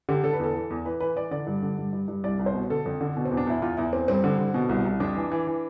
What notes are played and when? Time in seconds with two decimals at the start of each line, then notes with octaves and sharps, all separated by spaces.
0.09 D3 G4
0.24 D3 A4
0.33 B4
0.39 E2 A4
0.55 E3
0.70 E2
0.85 E3 B4
1.00 E3 B4
1.16 E3 D5
1.31 D3 D5
1.47 G2
1.62 D3
1.78 G2
1.93 G2
2.08 G2
2.24 C2 D5
2.39 C2
2.46 C5
2.54 B2
2.70 D3 A4
2.86 F2
3.01 D3
3.16 B2
3.25 C4
3.31 E2
3.37 D4
3.47 E2 E4
3.62 E2 F4
3.77 E2 E4
3.93 E2 C4
4.08 G2 C4
4.24 D3
4.38 D3
4.54 B2
4.69 C2
4.85 C2
5.00 F2 D4
5.16 E3
5.32 E3
5.47 E3